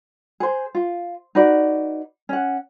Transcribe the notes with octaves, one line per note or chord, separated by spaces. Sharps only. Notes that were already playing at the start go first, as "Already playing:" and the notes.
G#4 C5
F4
D#4 F#4 B4 D5
C#4 F#5